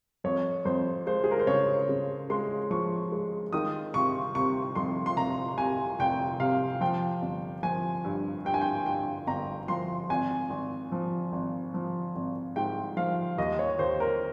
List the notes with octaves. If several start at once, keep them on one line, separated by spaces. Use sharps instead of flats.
F2 C#5
F2 C5
G#3 C5
G#4
A#4
C5
C#3 C#5
C#3
G#3 C6
F3 C#6
G#3
D#3 D#6
C3 C#6
C3 C#6
F2 C6
C6
F1 A#5
C3 G#5
F1 G5
C3 F5
F3 G5
G1
F3 G#5
G2
G2 G5
G#5
G5
G2 G5
G1 A#5
F3 C6
G#1 G#5
G#1
F3
G#1
F3
G#1
G#2 G5
F3 F5
D#2 D#5
C#5
D#2 C5
A#4